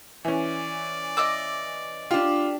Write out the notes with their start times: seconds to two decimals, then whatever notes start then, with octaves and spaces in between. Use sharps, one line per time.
0.25 E3 C#4 D5
1.17 D#5 D6 E6
2.11 D4 F4 G4